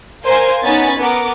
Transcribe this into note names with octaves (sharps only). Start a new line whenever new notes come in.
A#4 C5 F5 G#5
B3 C#4 D#4 G#5 B5 A6
B3 A#4 D6